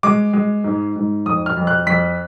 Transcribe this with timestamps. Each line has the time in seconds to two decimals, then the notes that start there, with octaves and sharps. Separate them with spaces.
0.03 G#3 D6
0.33 G#3
0.64 G#2
0.96 G#2
1.26 F2 D#6
1.46 F6
1.57 F2
1.67 F#6
1.86 F2 B6